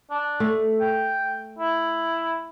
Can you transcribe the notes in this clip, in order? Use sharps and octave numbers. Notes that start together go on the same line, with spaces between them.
D4
A3
G5
E4